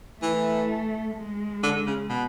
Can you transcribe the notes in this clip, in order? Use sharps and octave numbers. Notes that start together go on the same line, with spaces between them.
E3 A3
G#3
D3
C#3
B2